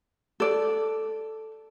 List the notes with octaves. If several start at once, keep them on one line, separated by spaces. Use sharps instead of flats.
A4 D5